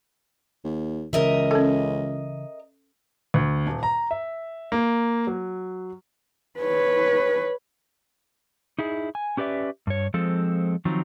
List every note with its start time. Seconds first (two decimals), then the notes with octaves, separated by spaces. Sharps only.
0.64 D#2
1.13 C#2 C#3 E3 A#4 D#5 E5
1.51 C#4 A4
3.34 D2
3.67 D#1
3.83 A#5
4.11 E5
4.72 A#3
5.27 F#3
6.60 B4 C#5
8.79 D#4 E4 G#4
9.15 G#5
9.37 C#4 G4 B4 D5 E5
9.87 G2 C#5
10.14 F3 G#3 C4 A4
10.85 D#3 F3 F#3 C4 D#4